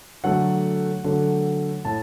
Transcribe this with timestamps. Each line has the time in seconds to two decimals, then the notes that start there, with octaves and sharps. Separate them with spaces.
0.24 D3 F#3 A3 F#5
1.04 D3 F#3 A3
1.85 A2 A3 A5